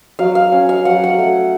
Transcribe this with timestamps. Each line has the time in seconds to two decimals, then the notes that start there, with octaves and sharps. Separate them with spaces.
0.19 F#3 F5
0.35 F5
0.52 C#4
0.69 F5
0.85 F#3 F#5
1.04 F#5
1.18 A3